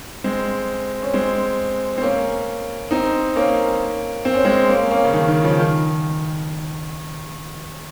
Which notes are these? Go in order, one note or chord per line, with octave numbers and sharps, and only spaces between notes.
G#3 C4
C#4
G#3 C4
C4
A#3 C#4
C4 D#4
A#3 C#4
C4
C#4
G#3 C4
A#3 C#4
A#3 C#4
C#3
D#3
D#3
C#3 F3
D#3